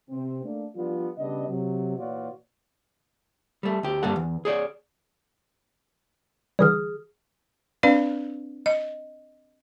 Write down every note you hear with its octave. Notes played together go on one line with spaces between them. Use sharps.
C3 C4
A3 A#3 D4
F3 G3 B3 D4 F4
C#3 G3 B3 D4 D#5
C3 F#3
A#2 E3 F4 F#4 C#5 D5
G3 A3
D2 G4
G2 G3 A#3 A4 F#5
E2
G#4 C#5 D5
D3 E3 G3 G#4 D#6 F6
C4 D4 B4 D5 F5
D#5